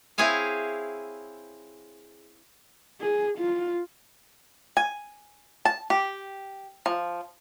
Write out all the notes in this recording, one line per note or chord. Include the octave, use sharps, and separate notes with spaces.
C4 E4 G#4 C#5 F5 G#5
G#4
F4
G#5
A5
G4
F3